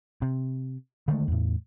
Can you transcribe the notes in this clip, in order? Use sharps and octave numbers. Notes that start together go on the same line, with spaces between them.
C3
D3 D#3 G#3 A3
E2 A2